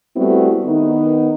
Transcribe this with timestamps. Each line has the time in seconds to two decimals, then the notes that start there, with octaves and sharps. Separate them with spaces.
0.16 G3 A3 B3 C4 E4 F#4
0.66 D#3 B3 D#4